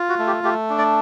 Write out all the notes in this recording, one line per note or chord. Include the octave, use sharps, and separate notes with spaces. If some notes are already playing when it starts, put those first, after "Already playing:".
Already playing: F4
F#4
A3
G4
A3 G4
D4
D5